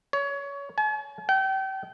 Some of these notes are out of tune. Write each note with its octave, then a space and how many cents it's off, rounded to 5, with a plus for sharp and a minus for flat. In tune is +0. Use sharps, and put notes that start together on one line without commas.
C#5 +25
G#5 +45
G5 -35